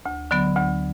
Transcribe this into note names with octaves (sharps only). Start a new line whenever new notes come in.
D2
D3 F#3 B3
D2